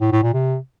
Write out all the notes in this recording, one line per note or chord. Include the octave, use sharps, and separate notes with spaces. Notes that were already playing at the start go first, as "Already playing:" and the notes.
A2
A2
A#2
C3